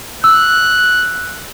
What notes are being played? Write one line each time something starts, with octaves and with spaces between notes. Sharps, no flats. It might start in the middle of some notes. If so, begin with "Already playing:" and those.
E6 F#6